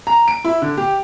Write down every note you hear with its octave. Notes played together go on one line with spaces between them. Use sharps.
A#5
D7
E4
D3
G4